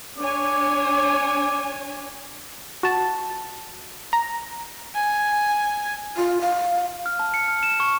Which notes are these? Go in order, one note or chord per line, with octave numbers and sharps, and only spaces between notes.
D4 C#5 G#5 D6
F#4 A5
A#5
G#5
F4
F5
F6
A5
C#7
F6
E7
C#6